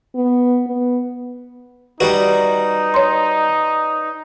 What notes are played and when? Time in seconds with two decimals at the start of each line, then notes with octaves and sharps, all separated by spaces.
0.15 B3
0.67 B3
2.00 G3 D#4 F#4 B4 D5
2.94 C#5 C6